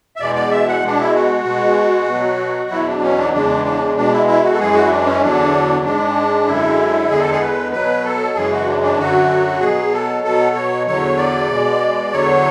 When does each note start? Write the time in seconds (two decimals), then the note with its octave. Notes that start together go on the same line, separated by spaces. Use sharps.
0.16 E5
0.20 E2 B2 G#3 D5
0.35 D5
0.51 E5
0.68 F#5
0.82 B2 G#3 D4
1.00 E4
1.15 F#4
1.45 B2 G#3
2.08 B2
2.13 F#3
2.71 E2 B2 F#3 E4
2.87 D4
3.03 C#4
3.18 D4
3.33 E2 C#3 G#3 D4
3.65 D4
3.96 B2 G#3 D4
4.13 E4
4.27 E4
4.43 F#4
4.54 A4
4.59 F#2 E3 G#3 G#4
4.74 F#4
4.84 E4
4.91 D4
5.06 C#4
5.21 E2 D3 F#3 D4
5.85 G#2 G#3 D4
6.47 F#2 D3 G#3 E4
7.10 E2 D3 G#3 G#4
7.20 A4
7.32 G#4
7.41 B4
7.72 B2 F#3 B4
8.04 A4
8.36 F#2 C#3 E3 G#3 G#4
8.52 F#4
8.67 D4
8.83 D4
8.98 F#2 D3 F#3 F#4
9.61 B2 G#4
9.66 F#3
9.93 A4
10.24 B2 F#3 A4
10.55 C#5
10.87 E2 D3 F#3 C#5
11.17 D5
11.50 B2 G#3
12.12 E2 D3 F#3 C#5